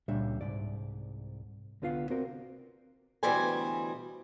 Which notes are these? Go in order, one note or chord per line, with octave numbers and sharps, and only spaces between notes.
C#2 A#2 G3 D4 E5
C2 G#2 D5
C2 D3 B3 F4 F5
C4 F#4 A#4 D5
D2 B2 E3 G3 C5 G#5